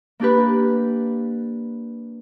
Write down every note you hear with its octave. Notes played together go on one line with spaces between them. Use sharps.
A#3 D4 G4 B4